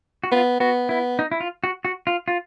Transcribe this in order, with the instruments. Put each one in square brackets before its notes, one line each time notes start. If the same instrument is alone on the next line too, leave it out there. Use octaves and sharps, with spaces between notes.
[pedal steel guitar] F#4
[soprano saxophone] B3 [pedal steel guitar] F4
[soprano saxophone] B3 [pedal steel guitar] F#4
[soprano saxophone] B3 [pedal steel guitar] E4
[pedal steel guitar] D#4
E4
F4
F#4
F#4
F4
F4